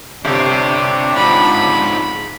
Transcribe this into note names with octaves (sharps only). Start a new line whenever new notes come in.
G1 C3 C4 D4 G4
G#2 F3 B5